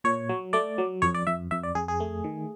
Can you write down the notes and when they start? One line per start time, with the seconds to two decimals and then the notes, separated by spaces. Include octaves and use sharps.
0.04 A#2 C#5
0.29 F#3
0.53 A3 D5
0.78 F#3
1.02 F2 C#5
1.14 D5
1.27 F2 E5
1.51 F2 E5
1.63 D5
1.75 F2 G#4
1.88 G#4
2.00 A3
2.24 D#3